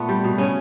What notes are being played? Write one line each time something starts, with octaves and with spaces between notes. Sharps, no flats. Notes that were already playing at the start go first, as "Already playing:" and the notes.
Already playing: A#2 A3 B3
G3
B2
C#3 C#4